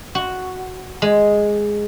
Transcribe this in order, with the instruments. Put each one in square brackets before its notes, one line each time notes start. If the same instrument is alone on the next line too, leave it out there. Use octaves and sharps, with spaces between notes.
[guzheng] F#4
G#3